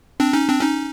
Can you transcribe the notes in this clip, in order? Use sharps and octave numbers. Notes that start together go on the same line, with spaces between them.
C4 D4
C#4 D#4
C4 D4
C#4 D#4